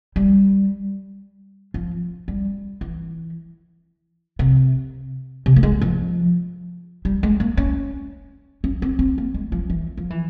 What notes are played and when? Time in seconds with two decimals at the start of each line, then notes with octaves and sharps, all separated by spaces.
0.16 G3
1.74 F3
2.28 G3
2.81 E3
4.39 C3
5.46 C3
5.56 A#3
5.63 G#3
5.81 F3
7.05 G3
7.23 G#3
7.40 A#3
7.57 C#4
8.64 C#4
8.82 C4
8.99 C4
9.18 A#3
9.34 G#3
9.52 F3
9.70 E3
9.97 F3
10.10 E3